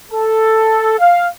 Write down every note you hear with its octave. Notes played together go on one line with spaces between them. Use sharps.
A4
F5